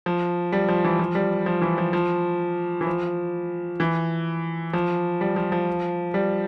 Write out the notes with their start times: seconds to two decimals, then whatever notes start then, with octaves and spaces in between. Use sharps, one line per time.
0.06 F3
0.52 G3
0.68 F3
0.85 E3
0.99 F3
1.15 G3
1.46 F3
1.62 E3
1.78 F3
1.93 F3
2.81 E3
2.87 F3
3.80 E3
4.73 F3
5.21 G3
5.36 F3
5.52 F3
6.14 G3